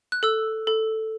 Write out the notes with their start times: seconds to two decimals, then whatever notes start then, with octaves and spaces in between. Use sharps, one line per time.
0.12 F#6
0.23 A4 E6
0.67 A4